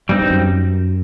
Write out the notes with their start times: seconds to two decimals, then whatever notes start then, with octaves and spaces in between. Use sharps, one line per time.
0.09 G2 G3 C4 D#4
0.22 G2
0.31 F#2